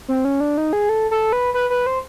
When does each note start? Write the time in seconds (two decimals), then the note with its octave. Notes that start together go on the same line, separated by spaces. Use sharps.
0.08 C4
0.25 C#4
0.40 D4
0.58 D#4
0.73 G#4
0.89 A4
1.11 A4
1.33 B4
1.54 B4
1.70 B4
1.87 C5